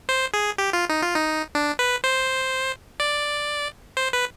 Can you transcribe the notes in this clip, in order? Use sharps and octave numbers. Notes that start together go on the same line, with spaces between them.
C5
G#4
G4
F4
D#4
F4
D#4
D4
B4
C5
D5
C5
B4